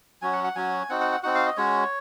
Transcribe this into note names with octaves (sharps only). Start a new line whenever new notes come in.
F#3 C#4 F#4 G#5
F#5
F#5
F#3 C#4 F#4 G#5
C4 D#4 F#4 F#5
F#5
F#5
C4 D#4 F#4 F#5
F5
D#5
G#3 C#4 F#4 C#5